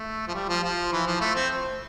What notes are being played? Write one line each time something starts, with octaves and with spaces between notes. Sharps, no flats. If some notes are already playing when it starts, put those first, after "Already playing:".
Already playing: A3
F3
G3
F3
F3
E3
F3
A3
C4